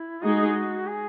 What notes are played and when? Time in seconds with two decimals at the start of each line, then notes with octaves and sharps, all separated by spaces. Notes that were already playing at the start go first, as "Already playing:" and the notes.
Already playing: E4
0.23 G#3 D#4 F#4 G#4
0.88 G#4